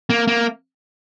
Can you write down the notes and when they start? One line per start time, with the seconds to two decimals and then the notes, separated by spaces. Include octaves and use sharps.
0.10 A#3
0.28 A#3